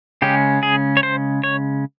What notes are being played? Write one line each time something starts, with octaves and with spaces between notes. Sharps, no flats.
C#3 G#3 C#4 G4
G#4
C#5
C5
C#5